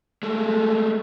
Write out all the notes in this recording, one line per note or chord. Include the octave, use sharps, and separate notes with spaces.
G#3 A3